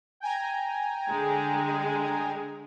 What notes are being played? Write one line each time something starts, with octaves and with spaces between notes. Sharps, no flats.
G5 G#5 A#5
D3 G#3